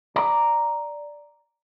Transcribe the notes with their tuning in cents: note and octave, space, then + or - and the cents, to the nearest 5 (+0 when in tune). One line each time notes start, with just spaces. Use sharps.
D5 +0 A#5 +0